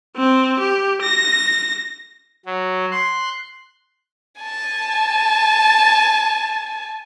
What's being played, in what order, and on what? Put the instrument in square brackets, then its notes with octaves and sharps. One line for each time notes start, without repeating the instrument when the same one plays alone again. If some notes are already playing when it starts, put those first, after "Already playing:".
[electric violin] C4
G4
A#6
[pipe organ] F#3
C6 F#6
[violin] G#5 A5